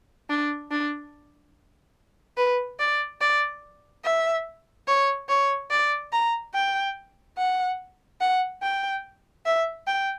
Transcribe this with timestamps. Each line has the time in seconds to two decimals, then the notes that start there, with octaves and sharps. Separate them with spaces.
0.29 D4
0.71 D4
2.37 B4
2.79 D5
3.21 D5
4.05 E5
4.88 C#5
5.28 C#5
5.71 D5
6.12 A#5
6.54 G5
7.38 F#5
8.20 F#5
8.62 G5
9.45 E5
9.87 G5